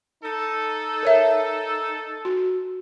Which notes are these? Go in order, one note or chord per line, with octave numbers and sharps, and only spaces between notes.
D#4 A4
A#4 C#5 E5
F#4